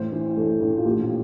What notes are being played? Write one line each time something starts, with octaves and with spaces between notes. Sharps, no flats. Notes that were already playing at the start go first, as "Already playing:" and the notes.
Already playing: A1 C5
E3
A1 A4
A1
F4
A#1 G4